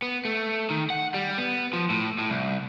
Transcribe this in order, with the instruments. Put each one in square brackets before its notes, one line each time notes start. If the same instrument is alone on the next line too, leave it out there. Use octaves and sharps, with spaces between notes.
[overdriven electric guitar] B3
A3
D#3
F#5
G3
B3
F3
A2
A2
C2